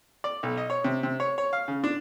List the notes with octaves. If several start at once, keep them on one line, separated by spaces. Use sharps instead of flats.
D5
B1
D#5
C#5
C3
C3
C#5
C#5
F5
C#3
D4